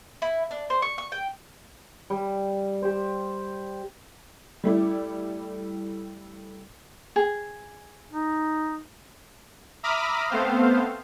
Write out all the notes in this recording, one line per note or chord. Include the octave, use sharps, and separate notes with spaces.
E4
D4
C5
C#6
C#6
G5
G3
G4 C5
G3 A3 E4 D5
G#4
D#4
E5 A#5 B5 D6 D#6 F6
A3 B3 C4 C5 F5